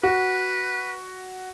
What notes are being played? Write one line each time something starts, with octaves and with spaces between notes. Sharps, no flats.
F#4 B4